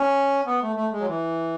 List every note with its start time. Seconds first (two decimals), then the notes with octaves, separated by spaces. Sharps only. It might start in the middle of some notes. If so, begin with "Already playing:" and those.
Already playing: C#4
0.46 B3
0.62 A3
0.76 A3
0.92 G#3
1.00 F#3
1.07 E3